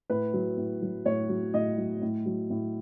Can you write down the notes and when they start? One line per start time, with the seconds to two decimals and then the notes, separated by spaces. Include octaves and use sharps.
0.10 A2 B4
0.34 F#3
0.57 A2
0.82 F#3
1.05 A2 C#5
1.29 F#3
1.54 A2 D#5
1.78 F#3
2.02 A2
2.26 F#3
2.50 A2